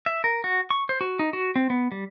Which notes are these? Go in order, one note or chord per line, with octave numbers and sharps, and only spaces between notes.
E5
A#4
F#4
C#6
C5
F#4
D#4
F#4
C4
B3
G3